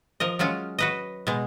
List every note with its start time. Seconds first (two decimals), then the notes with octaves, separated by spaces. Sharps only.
0.20 F3 A#4 D#5
0.39 F#3 G#3 C#4 F4
0.79 F#4 B4 D#5
1.27 B2 G#3